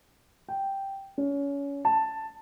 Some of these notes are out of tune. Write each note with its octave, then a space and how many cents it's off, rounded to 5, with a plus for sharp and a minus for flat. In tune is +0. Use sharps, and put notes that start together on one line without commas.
G5 -5
C#4 +25
A5 +5